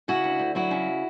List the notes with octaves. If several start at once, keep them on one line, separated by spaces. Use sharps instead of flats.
C#3 E4 F#4
D2
D2
F#3 E4 F#4
C#3